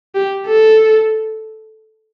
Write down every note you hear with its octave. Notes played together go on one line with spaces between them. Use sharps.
G4
A4